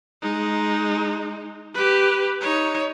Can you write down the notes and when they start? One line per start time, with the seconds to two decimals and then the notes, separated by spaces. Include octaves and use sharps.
0.22 G#3 D#4
1.74 G4 B4
2.41 D#4 C#5